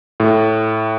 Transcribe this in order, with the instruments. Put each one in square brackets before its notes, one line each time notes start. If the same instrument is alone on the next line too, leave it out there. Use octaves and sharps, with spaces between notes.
[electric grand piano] A2